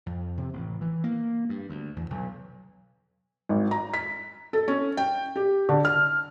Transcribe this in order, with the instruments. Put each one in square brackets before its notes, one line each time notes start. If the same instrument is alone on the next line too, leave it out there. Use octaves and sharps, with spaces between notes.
[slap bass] F2
C3
A1
E3
A#3
G2
D2
E2
B1
[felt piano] G#1
A#5
B6
A4
C#4
G5
G4
D3
F6